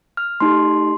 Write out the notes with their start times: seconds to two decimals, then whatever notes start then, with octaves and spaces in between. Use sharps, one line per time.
0.17 F6
0.40 A3 D#4 G4 C6